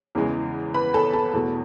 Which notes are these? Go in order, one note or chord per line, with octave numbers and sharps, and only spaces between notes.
E2 C#3 E3 G#3
B4 B5
A4 A5
A4 A5
E2 B2 A3